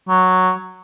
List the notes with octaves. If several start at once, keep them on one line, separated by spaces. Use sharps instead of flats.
F#3